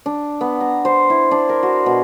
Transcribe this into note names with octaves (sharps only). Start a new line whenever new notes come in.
D4
B3
A#5
C5
E4
D4
A#4
F#4
B2